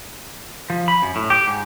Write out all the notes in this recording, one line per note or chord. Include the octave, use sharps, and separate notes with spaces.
F3
B5
F#2
A2
G4
G#2